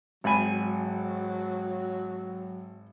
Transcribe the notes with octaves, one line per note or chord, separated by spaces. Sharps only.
G#1 G#2 F#3 G#5 B5